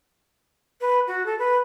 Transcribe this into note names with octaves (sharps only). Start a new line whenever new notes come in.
B4
F#4
A4
B4